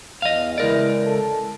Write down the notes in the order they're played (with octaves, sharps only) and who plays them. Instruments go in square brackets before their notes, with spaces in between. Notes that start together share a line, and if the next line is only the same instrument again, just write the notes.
[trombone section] E2 [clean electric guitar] D#5 F5
[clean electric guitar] C#2 A#4 D5 [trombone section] E3 G#3 E4
[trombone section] A4